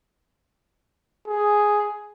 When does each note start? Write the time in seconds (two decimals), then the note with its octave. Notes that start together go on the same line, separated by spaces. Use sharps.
1.27 G#4